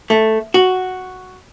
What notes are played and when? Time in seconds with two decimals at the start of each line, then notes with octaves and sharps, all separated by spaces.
0.10 A3
0.54 F#4